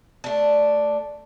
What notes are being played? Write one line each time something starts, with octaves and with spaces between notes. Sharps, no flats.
A3 D4